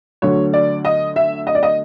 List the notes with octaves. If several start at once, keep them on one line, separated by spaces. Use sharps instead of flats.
D2 D3 F#3 C#5
D5
D#5
E5
D#5
D5
D#5